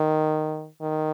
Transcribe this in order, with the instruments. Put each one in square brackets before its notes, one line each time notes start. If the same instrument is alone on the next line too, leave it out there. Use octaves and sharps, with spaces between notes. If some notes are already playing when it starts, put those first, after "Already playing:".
Already playing: [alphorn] D#3
D#3